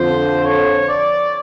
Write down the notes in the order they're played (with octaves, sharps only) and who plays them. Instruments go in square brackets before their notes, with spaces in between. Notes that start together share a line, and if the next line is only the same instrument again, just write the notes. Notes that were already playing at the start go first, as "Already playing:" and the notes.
Already playing: [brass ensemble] F2 D3 F3 C5
C#5
D5